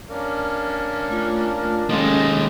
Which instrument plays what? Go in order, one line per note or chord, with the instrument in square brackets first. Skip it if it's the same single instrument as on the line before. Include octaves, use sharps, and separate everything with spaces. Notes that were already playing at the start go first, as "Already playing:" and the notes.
[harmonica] A#3 C#4 D4
[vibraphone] A3 F4
[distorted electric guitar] D#2 G#3 [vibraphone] C#4 A4 [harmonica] D#5